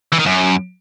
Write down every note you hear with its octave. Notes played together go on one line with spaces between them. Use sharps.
E3
D#3
F#2